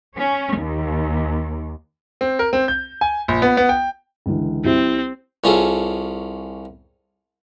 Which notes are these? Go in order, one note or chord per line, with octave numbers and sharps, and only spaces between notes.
C#4
D#2
C4
A#4
C4
G6
G#5
A#1
B3
B3
G5
C#2 D3 E3
C2 C4 E4
C2 C#4 F4 G#4 A4